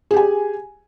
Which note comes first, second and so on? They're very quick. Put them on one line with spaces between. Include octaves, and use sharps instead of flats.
G#4 G4 G#5